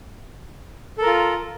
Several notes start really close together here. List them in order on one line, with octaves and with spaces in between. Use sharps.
A4 A#4 F4